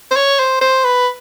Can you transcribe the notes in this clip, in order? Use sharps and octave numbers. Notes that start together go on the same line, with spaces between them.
C5
C#5
C5
C5
B4